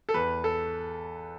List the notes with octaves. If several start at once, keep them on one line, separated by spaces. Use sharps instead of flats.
A4
E2 B4
A4